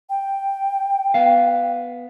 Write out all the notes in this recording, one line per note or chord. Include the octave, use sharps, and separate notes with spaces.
G5
B3 F5